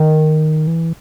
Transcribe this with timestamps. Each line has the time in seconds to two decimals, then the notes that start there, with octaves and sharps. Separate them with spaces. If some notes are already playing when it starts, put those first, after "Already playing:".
Already playing: D#3
0.67 E3